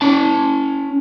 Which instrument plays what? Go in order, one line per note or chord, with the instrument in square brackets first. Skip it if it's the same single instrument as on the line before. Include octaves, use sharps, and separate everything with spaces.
[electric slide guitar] C#4 A5